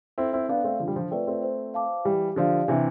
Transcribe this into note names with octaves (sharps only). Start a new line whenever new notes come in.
C4 E4 A4
C4 E4
B3 D4 D5 F5
A3 C4
D3 F3 F4
G3
D3 F3
A3 C4 B4 D5 G5
A3 C4
C5
F5 A5 D6
E3 G3 G4
D3 F3 D5 F5
C3 E3 D4